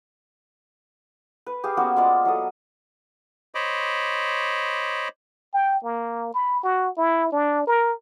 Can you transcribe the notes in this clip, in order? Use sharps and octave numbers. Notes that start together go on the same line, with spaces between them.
B4
G4 G#4 F5
A#3 B3 C#4 F#4
G#3 F4 D5
F#3 A4 D#6
C5 C#5 D#5 B5 D6
G5
A#3
B5
F#4
E4
D4
A#4